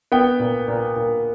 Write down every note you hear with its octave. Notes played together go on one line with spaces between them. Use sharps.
B3 G5
A#2
A#2
A#2